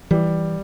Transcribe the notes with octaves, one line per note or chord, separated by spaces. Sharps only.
E3 G3